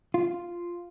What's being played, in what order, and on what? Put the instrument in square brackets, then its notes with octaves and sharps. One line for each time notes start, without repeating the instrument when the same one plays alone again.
[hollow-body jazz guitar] F4